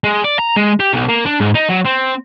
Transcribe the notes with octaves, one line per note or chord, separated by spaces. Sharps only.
G#3
D5
A#5
G#3
G4
B1
A#3
D4
G#2
D#4
F#3
C4